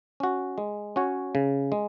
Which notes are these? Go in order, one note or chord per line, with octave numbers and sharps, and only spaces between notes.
C#4 F#4
G#3
C#4 F#4 C#5
C#3
G#3